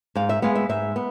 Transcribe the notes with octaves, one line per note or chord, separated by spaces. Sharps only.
G#2 F5
E5
G#3 B3 F5
E5
G#2 E5
B3